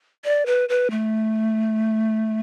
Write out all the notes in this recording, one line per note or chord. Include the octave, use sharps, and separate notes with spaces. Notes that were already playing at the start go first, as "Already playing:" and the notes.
D5
B4
B4
A3